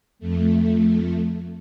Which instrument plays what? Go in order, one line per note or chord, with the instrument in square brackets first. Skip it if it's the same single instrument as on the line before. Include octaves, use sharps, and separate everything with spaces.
[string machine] F2 A3